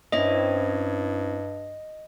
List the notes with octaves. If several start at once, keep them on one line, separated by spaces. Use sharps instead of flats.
G2 C4 C#4 E4 D#5